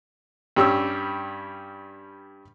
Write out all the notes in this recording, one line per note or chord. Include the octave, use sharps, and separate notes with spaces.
G2 G3 C#4 E6